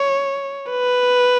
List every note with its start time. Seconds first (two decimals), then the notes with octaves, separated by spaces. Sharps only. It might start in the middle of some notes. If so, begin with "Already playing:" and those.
Already playing: C#5
0.71 B4